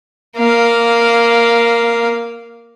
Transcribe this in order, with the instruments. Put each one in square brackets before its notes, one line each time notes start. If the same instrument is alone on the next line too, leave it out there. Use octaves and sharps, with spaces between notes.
[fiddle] A#3 F5